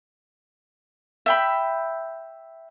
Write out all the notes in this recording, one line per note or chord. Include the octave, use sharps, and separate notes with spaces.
E5 G5 B5